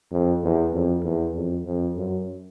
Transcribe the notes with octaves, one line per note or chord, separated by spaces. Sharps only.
F2
E2
F2
E2
F2
F2
F#2